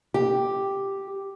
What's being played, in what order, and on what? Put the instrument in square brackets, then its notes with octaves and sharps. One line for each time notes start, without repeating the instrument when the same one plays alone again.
[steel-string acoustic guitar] G4